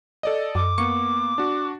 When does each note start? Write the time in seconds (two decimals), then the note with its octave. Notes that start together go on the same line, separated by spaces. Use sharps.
0.23 A4 D5 D#5
0.55 F#2 D6
0.78 A#3 B3 C#6 C#7
1.38 D4 F#4